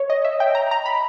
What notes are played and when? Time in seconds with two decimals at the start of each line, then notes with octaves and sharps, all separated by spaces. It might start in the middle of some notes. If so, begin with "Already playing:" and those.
Already playing: C#5
0.10 D#5
0.25 E5
0.40 G5
0.55 A#5
0.71 A#5
0.86 B5